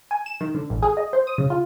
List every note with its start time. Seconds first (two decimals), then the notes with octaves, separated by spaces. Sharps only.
0.11 G#5
0.26 E7
0.41 D#3
0.54 D3
0.70 A1
0.83 G#4
0.97 D#5
1.13 C5
1.27 D#6
1.38 C#3
1.50 F4